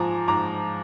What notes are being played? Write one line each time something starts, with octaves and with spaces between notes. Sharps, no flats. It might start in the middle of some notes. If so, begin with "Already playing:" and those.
Already playing: G#2 F3 G#5 A#5 D6
G#2 A#5 D6